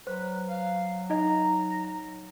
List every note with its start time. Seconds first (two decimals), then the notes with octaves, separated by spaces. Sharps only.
0.07 F#3 B4 C5
0.49 F5
1.10 D#4 D#5 A#5